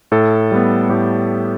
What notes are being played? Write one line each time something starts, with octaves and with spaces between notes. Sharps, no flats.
A2 A4
G3 B3
A2 G4